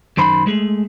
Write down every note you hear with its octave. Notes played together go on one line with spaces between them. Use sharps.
F#2 D#3 C5 B5
G#3 A3 G#4